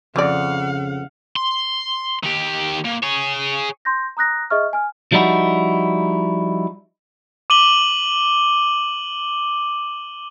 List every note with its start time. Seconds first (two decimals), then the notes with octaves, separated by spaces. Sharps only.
0.16 F2 C#3 F3 D5 F5 F#5
1.36 C6
2.23 D#3 G4
2.85 A#2
3.03 G#4 C#5
3.85 C6 G6 A#6
4.17 A#5 D#6 F#6 A#6
4.50 G#4 D#5 E5 C#6 F6
4.73 G#5 F6
5.12 F3 G3 D#4 E4 F#4
7.50 D6 D#7 F#7 G7